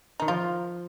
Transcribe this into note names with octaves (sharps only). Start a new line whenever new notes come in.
D#3 D#4
F3 F4